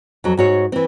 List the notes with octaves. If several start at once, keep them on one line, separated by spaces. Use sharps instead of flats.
F2 F#3
G#2 F#4 C#5
E3 C4